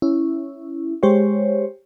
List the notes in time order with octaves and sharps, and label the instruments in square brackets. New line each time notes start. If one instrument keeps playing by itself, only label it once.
[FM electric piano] C#4 E4
G#3 G4 C5 C#5